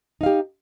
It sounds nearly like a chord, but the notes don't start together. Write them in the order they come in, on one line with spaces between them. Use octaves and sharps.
D#4 F5 G4